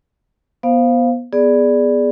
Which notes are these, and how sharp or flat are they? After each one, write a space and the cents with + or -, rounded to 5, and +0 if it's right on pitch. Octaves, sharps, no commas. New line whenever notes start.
B3 -20 C5 +0 F5 +0
B3 +0 G#4 +0 D5 +0